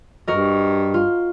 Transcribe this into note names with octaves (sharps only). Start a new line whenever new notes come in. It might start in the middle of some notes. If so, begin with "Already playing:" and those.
G2 F#4 A#4 D#5
F4